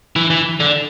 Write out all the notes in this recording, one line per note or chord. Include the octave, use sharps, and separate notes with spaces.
E3
E3
D3